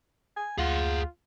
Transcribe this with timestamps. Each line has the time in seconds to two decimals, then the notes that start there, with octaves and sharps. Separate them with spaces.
0.37 G#5
0.58 D2 F4 G#4 F#5